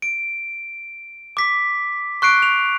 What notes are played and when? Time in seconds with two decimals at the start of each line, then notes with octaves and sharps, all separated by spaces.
0.02 D7
1.37 D6 B6
2.22 C#6 F#6 C7 D7
2.42 F7